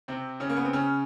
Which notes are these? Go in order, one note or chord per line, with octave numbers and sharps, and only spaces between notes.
C3 C4
C#3 C#4
A#3
B3
C4
C#3 C#4